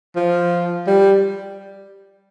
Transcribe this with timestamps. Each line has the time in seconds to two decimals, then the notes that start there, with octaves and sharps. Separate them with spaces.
0.16 F3
0.87 G3